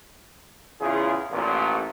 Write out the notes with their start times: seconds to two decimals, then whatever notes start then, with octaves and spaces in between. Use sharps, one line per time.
0.81 E2 C#3 E4 F4 G#4
1.32 A1 A#2